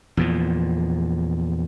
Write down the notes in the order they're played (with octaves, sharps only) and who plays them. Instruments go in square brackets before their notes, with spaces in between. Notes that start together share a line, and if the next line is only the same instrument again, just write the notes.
[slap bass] E2 A#2 F3